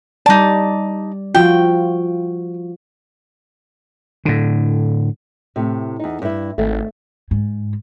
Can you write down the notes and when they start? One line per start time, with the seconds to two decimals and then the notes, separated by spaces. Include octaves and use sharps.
0.26 G3 D#4 D5 A5
1.35 F3 F4 F#4 G5
4.25 A2 D3
5.56 A2 C3
6.00 E2 D#4
6.22 G2 E4
6.58 G#1 A3
7.31 G#2